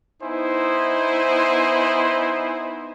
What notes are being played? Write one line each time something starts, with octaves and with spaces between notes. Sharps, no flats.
B3 D#4 E4 C5 G#5